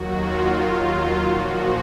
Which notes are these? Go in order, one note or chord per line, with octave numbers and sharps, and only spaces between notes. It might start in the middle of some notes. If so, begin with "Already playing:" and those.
Already playing: D#2 D#3 F#3 F#4
F4
D#2 D#3 F#3 F4
A#2 F3 F#4